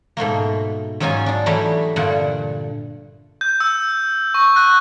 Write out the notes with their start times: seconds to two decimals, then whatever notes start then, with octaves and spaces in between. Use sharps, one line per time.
0.17 G#2 B2 A3 A#3
1.00 G#2 F#3 C#4 D#4 F4 G#5
1.26 D4 D#4
1.46 E3 F#3 G3 A3 D#4 E4
1.96 G2 A#2 D3 F#5
3.41 G6
3.60 E6
4.34 C#6
4.56 F#6